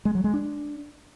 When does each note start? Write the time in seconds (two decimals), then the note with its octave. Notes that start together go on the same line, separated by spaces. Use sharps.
0.05 G#3
0.15 F#3
0.24 G#3
0.34 D4